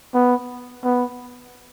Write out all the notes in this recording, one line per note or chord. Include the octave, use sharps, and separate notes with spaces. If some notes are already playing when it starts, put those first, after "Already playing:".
B3
B3